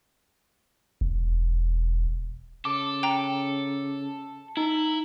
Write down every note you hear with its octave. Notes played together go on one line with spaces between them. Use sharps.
E1
C#3 A4 D6
G5 A#5
D#4 E4